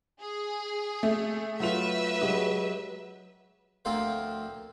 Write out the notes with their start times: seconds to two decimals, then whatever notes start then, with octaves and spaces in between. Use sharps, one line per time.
0.21 G#4
1.03 A3
1.60 F#3 F4 B4 E5 F7
2.21 F#3 G#3 G4
3.85 D2 F3 A#3 C4 F4 C5